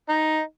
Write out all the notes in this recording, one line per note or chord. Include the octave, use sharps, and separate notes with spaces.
D#4